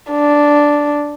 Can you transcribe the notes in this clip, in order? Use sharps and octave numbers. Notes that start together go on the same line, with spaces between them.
D4